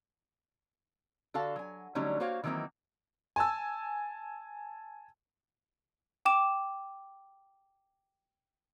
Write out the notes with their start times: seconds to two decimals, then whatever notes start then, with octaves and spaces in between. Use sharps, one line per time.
1.34 D3 F#4 A4 F5 A5
1.56 F#3 G#5
1.95 D3 F#3 G3 A3 C#4 D#4
2.20 A#3 F#4 C5 C#5 F5
2.44 D#3 E3 F#3 A#3 C4 D#4
3.36 G#5 A5 E6
6.25 G5 D6 E7